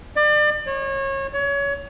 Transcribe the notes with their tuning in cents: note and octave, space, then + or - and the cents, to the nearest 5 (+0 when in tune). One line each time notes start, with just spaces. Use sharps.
D5 +35
C#5 -30
C#5 +25